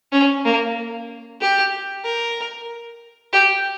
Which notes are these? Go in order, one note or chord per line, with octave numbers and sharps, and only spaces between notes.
C#4
A#3
G4
A#4
G4